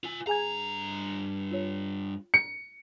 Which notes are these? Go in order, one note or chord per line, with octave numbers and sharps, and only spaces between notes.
F4 G#5
G2 G#4 G#5 A#5 G#6
F4 C#5
C#7